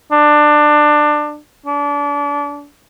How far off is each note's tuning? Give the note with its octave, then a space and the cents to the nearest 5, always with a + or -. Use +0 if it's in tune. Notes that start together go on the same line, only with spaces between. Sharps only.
D4 +20
D4 -30